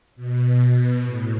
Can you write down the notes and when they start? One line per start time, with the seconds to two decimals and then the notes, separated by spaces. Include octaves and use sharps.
0.16 B2
1.03 A2